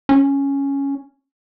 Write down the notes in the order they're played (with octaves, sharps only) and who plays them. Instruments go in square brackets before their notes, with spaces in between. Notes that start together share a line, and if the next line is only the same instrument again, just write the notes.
[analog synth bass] C#4